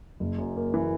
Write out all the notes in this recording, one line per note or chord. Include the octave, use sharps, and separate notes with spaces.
F#1
F#2
A#3
E3